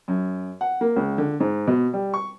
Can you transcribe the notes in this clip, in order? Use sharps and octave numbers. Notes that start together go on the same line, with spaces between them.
F#2
F#5
A#3
C#2
D3
G#2
B2
G3
C#6